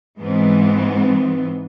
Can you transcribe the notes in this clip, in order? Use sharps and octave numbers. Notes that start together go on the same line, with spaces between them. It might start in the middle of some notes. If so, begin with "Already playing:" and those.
G#2 E3 B3 C4